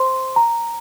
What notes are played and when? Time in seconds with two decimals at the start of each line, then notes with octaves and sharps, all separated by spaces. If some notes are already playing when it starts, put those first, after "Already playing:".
Already playing: C5 C6
0.36 A#5